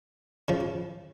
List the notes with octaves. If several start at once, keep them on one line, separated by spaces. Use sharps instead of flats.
C#3 F3